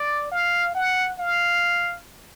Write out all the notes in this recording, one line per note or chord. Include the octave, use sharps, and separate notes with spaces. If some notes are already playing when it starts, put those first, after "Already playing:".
Already playing: D5
F5
F#5
F5